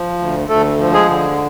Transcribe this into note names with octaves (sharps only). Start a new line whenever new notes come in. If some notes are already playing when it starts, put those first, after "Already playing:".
Already playing: F3
D2
D2 A3 A4
F3
G#3 G#4
D3